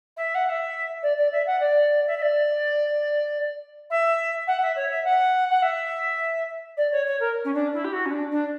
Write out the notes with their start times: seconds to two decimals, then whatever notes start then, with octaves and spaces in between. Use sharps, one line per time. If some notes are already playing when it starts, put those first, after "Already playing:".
0.17 E5
0.35 F#5
0.46 F#5
0.49 E5
1.03 D5
1.18 D5
1.32 E5
1.47 F#5
1.60 D5
2.07 E5
2.18 E5
2.22 D5
3.90 E5
4.47 F#5
4.62 E5
4.76 C#5
4.90 E5
5.04 F#5
5.50 F#5
5.62 E5
6.77 D5
6.92 C#5
7.07 C#5
7.20 A#4
7.45 C#4
7.54 D4
7.74 E4
7.85 G4
7.93 F#4
8.06 C#4
8.11 D4
8.31 D4